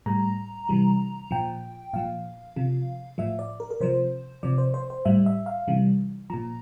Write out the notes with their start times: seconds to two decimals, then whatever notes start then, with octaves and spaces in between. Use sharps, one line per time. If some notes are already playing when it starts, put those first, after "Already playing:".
0.06 A2 G3 A#5
0.69 C3 E3 G3
1.31 A#2 F3 G5
1.93 A#2 F3 F5
2.56 C3 F3
3.18 A2 F3 E5
3.39 D5
3.60 A#4
3.71 A#4
3.81 C3 F3 C5
4.43 C3 F3 D5
4.58 C5
4.74 C5
4.90 C5
5.05 A2 G3 E5
5.26 E5
5.46 F5
5.68 C3 E3 G3
6.30 A#2 F3 A#5